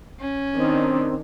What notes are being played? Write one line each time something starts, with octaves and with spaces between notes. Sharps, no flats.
C#4
D#3 C4 D4